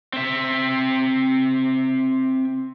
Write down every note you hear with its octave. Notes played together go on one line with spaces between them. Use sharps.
C4 E5